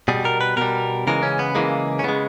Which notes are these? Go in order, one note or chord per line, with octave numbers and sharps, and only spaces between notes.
B2 G3 G#4
A#4
B4
B2 G3 A#4
C#3 E3 G#3 A#4
C#4
B3
C#3 E3 G#3 A#3
C#4
C#3 G#3 B3